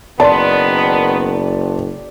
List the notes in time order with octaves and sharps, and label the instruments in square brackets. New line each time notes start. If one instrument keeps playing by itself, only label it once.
[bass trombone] F#1 [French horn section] D#3 B3 [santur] D5 [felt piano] A5 C6